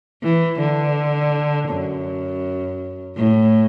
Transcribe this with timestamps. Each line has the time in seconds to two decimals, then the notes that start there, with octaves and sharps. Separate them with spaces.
0.23 E3
0.60 D3
1.70 F#2
3.17 A2